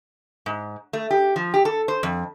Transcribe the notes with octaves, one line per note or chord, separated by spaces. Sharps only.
G#2
A3
G4
F3
G4
A4
C5
F2